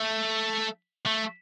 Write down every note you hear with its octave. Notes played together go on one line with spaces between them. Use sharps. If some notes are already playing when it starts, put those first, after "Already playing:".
Already playing: A3
A3